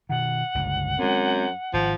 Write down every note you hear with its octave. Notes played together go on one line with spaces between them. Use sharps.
B2 D#3 F#5
G1 C#2 D3
F#2 G#3 C4
G#1 F3